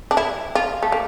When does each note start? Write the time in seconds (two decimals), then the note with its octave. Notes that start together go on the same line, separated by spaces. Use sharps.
0.11 D4
0.17 E4
0.55 F4
0.83 A3
0.92 A#3